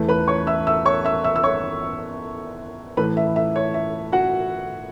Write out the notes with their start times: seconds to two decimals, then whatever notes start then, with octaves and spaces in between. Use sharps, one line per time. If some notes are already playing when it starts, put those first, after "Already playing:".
Already playing: E2 E3 A3
0.09 B4 B5
0.28 C#5 C#6
0.47 E5 E6
0.67 E5 E6
0.85 C#5 C#6
1.05 E5 E6
1.24 E5 E6
1.36 E6
1.43 C#5 C#6
2.97 A2 E3 A3 B4 B5
3.17 E5
3.36 E5
3.56 C#5
3.74 E5
4.12 F#4 F#5